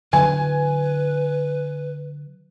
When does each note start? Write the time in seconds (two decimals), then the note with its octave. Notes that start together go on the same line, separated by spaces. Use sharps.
0.13 D3 F#3 B4 G#5